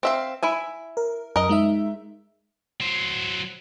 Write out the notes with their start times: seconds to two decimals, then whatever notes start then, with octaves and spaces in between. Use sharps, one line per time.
0.03 C4 E5 F5
0.43 E4 E5 G#5
0.97 A#4
1.36 F#2 A#4 D#5
1.49 G#3 D#4 E5
2.80 F#3 C5